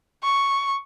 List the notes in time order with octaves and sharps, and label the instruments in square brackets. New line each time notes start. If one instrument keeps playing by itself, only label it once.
[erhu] C#6